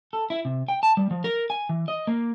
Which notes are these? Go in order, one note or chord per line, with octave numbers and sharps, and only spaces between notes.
A4
E4
C3
G5
A5
G3
F3
A#4
G#5
E3
D#5
A#3